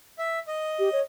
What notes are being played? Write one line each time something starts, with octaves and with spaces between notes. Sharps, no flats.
E5
D#5
G4
C#5